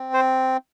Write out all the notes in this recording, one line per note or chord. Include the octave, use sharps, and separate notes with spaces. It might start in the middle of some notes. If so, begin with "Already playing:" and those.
Already playing: C4
C5